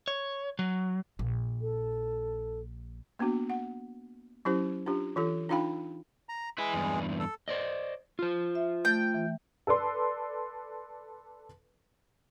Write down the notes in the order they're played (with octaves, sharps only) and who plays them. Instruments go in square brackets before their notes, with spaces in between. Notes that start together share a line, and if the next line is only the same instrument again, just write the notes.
[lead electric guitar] C#5
F#3
[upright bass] A#1
[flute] A4
[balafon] A#3 B3 D4 F#4
F#5
F#3 C#4 E4 G4 C5
D4 F4 G4
E3 F4 A4
D4 D#4 F4 F5 G5 B5
[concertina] A#5
[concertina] G#3 [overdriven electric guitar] E4 B4
[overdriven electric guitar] E2 G2
[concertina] A4
[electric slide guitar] C5 D5 D#5
F4 C5
[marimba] E5
[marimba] A3 A6 [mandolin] G5
[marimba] E3
[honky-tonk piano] A4 B4 D5 C6